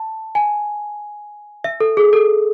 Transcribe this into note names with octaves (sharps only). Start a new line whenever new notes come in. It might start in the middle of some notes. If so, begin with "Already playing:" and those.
Already playing: A5
G#5
E5
A4
G#4
A4